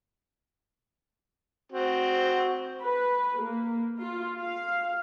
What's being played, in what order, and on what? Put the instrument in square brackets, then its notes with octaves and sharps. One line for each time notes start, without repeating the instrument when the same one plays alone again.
[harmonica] C4 F#4
[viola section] B4
A#3
F4
F5